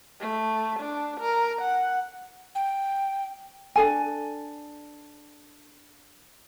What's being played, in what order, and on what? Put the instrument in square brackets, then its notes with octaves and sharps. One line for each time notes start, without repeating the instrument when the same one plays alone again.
[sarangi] A3
D4
A#4
F#5
[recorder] G5
[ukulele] D4 A4 G#5